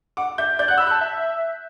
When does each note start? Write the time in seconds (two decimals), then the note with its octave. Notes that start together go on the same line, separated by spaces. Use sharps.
0.17 F#5 D6
0.38 E5 G6
0.59 D5 G6
0.68 F#5 F#6
0.77 B5 E6
0.87 A5 F#6
1.01 E5